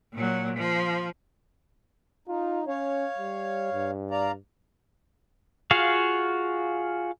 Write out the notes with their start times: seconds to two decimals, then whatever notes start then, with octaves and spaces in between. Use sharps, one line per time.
0.14 A#2 F#3
0.57 F3
2.28 D#4 F4
2.68 C#4 C#5 F5
3.18 G3
3.73 G2
4.11 D5 F5 A#5
5.71 F4 F#4 G#4 F5